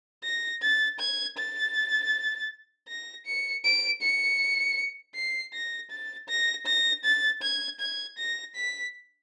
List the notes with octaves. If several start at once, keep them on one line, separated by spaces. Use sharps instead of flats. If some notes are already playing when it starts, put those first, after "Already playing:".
A#6
A6
G#6
A6
A#6
C#7
D7
C#7
C7
A#6
A6
A#6
A#6
A6
G#6
G#6
A#6
B6